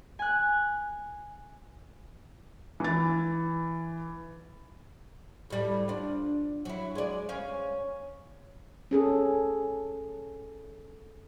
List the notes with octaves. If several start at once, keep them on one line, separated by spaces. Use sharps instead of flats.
G#5 F#6
E3 A6
A2 G3
D4 F4
F#3 E4
G#3 D5
C#4 F5
C#4 G#4 A4